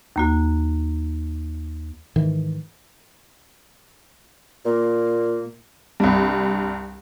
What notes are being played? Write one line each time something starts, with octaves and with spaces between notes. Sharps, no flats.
D#2 A#3 F#4
G#2 D#3 E3
A#2 A#3
C2 G2